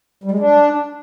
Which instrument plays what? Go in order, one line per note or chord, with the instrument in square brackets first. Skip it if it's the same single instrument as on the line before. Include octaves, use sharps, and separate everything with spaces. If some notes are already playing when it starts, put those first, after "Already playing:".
[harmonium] G3
G#3
D4